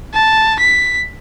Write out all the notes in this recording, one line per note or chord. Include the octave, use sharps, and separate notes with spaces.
A5
B6